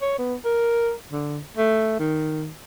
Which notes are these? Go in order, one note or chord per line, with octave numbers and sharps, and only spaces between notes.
C#5
B3
A#4
D3
A3
D#3